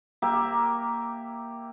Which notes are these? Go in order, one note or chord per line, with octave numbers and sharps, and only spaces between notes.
A#3 G4 E5